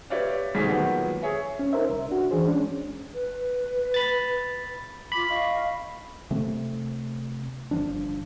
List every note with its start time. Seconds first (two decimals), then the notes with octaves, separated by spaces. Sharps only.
0.10 G4 B4 C#5 D5 E5 F5
0.55 B1 G3 D#4 G#4 C5 B6
0.68 A#2 D#3 F3 F#3 G#3 B3
1.22 G#4 C#5 E5 G#5
1.59 C#4
1.73 D#4 A#4 C5 E5
1.89 C2
2.09 D4 F#4
2.31 E3 D4 G#4 C5
2.47 G#3 C#4 D4
3.12 B4
3.94 B5 A6
5.12 F4 B5 D6
5.29 D#5 F5 C#6
6.30 C3 A3 C4
7.71 G1 F3 D4